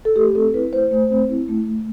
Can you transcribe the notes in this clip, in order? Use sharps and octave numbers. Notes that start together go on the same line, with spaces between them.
A4
A3 G4
C4 A4
E4 B4
A3 C5
A3
C4
E4
A3
A3